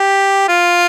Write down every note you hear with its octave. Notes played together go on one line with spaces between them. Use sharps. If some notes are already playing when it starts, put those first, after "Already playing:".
Already playing: G4
F4